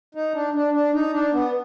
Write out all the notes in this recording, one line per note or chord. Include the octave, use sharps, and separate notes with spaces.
D#4
D4
D4
D4
D#4
D4
B3